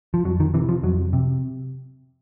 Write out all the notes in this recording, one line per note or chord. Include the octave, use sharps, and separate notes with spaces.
F3
F2 F#3
D#3
C3 E3
F3
F2 F#3
C3